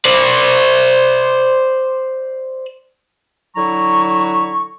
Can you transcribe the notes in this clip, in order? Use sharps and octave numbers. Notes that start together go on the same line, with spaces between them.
C5 D5
D3 F#3 E4 A#5 C#6